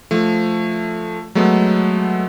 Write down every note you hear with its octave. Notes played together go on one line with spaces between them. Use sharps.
F3 A3
F#3 G#3 A3 B3